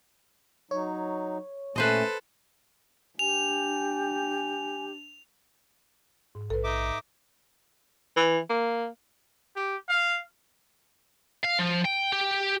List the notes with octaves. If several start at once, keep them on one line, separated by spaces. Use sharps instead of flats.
F#3 D#4 C#5
A#2 A3 C#4 A4 B4 C5 D#5
D4 G4 G#5 F7
G#2
A#1 A4 B4
D#4 E5 D6
E3
A#3
G4
F5
F5
F3
G5
G4